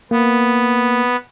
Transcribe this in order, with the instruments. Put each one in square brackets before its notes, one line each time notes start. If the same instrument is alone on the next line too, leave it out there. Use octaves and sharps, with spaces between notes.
[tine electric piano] A#3 [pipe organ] B3